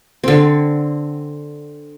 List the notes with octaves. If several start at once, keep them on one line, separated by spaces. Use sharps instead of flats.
D3 C4